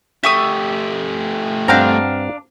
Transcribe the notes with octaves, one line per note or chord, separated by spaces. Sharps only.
A3 G4 E5 C#6 D#6
G2 C4 D4 F5 F#5 A#5